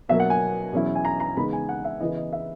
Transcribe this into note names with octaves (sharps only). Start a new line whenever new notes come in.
B2 F#3 A#3 E5
F#5
G#5
E2 B2 F#3 C#4 E4
G#5
A#5
A#5
E2 C#3 G#3 B3 D#4 B5
G#5
F#5
E5
C#3 E3 B3 E4 D#5
D#5
E5